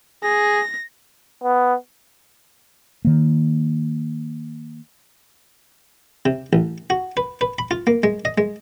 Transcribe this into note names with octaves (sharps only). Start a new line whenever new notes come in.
G#4 A#6
B3
D#3 A#3
C3
A1
F#4
B4
B4
B5
F4
A#3
G#3
D#5
G#3